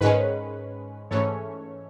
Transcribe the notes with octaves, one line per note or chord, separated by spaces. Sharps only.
G#2 D#3 G#3 C#4 B4
G#2 E3 A3 C#4 A4 C#5